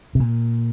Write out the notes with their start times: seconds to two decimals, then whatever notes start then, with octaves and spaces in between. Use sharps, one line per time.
0.15 C3
0.20 A#2